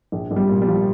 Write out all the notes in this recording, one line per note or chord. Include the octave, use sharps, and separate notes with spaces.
A#1
A#1
G3
A#2
G3
F3